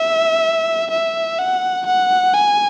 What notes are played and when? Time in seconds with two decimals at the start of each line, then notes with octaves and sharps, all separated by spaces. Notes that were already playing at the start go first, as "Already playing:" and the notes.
Already playing: E5
0.91 E5
1.39 F#5
1.87 F#5
2.34 G#5